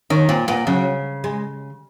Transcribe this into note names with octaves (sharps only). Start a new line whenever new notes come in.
D#3 C#4
A#2 C4
A#2 B3
C#3 F#3
G#3